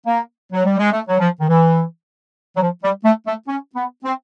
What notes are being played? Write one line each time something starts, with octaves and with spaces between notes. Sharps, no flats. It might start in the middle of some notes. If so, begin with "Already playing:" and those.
A#3
F#3
G3
G#3
A3
F#3
F3
D#3
E3
F#3
F3
G3
A3
A3
C#4
B3
C4